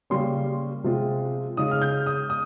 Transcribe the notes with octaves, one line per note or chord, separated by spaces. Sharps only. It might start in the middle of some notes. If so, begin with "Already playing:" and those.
C#3 G3 A#3 C#4 C6
C3 F3 G#3 C4 F4
C#3 G#3 D#4 D#6
F6
G6
D#6
D#6